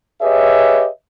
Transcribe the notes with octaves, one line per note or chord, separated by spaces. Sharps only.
G4 G#4 B4 C#5 D#5 E5